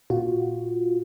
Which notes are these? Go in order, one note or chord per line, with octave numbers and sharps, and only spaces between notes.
A#2 F4 F#4